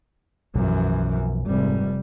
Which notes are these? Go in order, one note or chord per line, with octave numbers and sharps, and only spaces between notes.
B1 F#2 E3 F3
F1 G#2 C3 G3